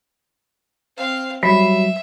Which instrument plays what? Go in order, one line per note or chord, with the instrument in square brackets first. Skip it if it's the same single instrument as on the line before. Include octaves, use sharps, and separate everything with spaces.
[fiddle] C4 F5
[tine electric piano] F#3 G3 [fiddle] E5 [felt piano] B5 B6 C7